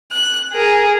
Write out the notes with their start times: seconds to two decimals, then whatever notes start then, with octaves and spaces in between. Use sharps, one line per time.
0.12 F#6
0.53 G#4 A#4